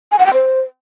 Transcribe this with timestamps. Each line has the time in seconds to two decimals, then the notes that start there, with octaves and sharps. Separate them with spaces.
0.11 G#5
0.19 F#5
0.26 G5
0.33 C5